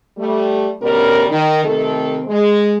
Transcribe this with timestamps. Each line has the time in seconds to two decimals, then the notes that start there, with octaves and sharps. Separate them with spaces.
0.18 G3 A3
0.81 D2 B2 G3 C#4 A#4
1.29 D#3
1.64 C3 D#3 A3 C4 A4
2.27 G#3